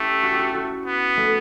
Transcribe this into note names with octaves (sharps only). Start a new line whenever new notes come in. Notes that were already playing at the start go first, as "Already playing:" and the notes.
Already playing: A3 C#4 E4 G4
F#4
G4
F#4
F#4
B3
A3